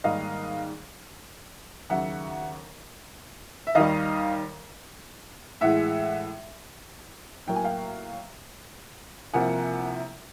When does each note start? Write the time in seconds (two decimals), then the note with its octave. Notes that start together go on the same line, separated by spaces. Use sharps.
0.04 G#2 D#3 G3 A#3 D#5 F5
1.89 D#2 C#3 F#3 E5 F#5
3.67 E5
3.75 D#2 D#3 G3 D#5 F5
5.61 A2 E3 G#3 E5 F#5
7.47 A2 F#3 A#3 G5
7.56 G#5
7.64 F5 G5
9.34 C2 C3 F3 A#3 F#5 G#5